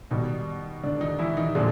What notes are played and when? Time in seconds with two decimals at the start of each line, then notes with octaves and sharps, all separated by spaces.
0.11 B2 D#3 G3 D#4
0.84 D3 D4
1.00 D#3 D#4
1.19 E3 E4
1.37 D#3 D#4
1.55 A#2 D3 F3 G#3 D4